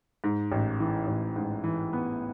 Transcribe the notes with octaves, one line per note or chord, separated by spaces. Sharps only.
G#2
A1
E3
A1
G#2
E3
B3